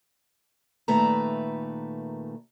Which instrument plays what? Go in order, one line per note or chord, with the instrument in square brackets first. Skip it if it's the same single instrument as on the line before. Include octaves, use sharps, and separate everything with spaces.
[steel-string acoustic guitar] A#2 D#3 A3 B4 E5 A#5